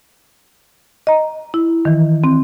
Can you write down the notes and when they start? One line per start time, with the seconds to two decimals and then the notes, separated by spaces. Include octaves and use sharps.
1.07 D#5 A#5
1.54 E4
1.85 D#3 E3
2.24 C4